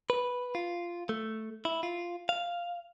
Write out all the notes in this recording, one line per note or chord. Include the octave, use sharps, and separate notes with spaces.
B4
F4
A3
E4
F4
F5